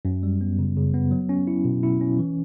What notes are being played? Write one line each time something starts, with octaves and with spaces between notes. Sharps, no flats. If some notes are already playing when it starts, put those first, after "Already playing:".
F#2
G3
B3
C#3
C#3
B3
F#3
C#4
E4
B2
E4
C#4
E3